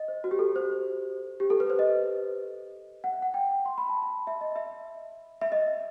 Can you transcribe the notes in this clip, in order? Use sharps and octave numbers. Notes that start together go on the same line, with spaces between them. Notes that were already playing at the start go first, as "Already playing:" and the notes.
Already playing: D#5
C5
F#4
G4
A4
C5
G4
A4
B4
C5
D#5
F#5
E5
F#5
G5
C6
B5
A5
B5
E5
D#5
E5
E5
D#5